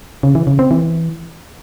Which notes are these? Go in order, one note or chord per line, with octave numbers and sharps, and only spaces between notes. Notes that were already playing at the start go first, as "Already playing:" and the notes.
C#3
E3
C#3
C4
E3